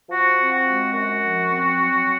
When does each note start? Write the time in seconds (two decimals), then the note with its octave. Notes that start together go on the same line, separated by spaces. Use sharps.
0.09 F3 F#4
0.37 C4
0.51 F#4
0.65 G#3
0.93 F#2 F#4
1.21 F3
1.48 C4
1.77 F#3